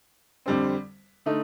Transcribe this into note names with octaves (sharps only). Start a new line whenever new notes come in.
F2 D3 G3 C4
D3 A3 D#4